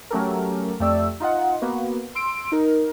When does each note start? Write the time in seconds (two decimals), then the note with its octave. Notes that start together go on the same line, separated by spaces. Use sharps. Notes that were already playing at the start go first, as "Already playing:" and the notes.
0.10 F#3 A3 C#4 G4 A4 A#4
0.80 F2 A3 G4 D5 E6
1.20 D#4 F4 D#5 F#5
1.62 A#3 B3 F#4 B4
2.15 C6 E6 D7
2.52 D#4 A#4